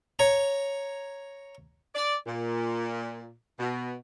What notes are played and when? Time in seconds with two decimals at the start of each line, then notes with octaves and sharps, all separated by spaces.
0.19 C#5 A#5
1.95 D5
2.27 A#2
3.59 B2